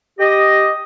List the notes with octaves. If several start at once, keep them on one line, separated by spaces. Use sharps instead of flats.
G4 D#5